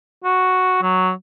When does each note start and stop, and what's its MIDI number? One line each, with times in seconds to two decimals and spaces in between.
0.24 0.81 66
0.82 1.11 54